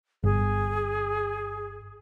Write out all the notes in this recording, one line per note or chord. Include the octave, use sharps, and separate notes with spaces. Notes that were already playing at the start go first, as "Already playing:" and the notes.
G1 G#4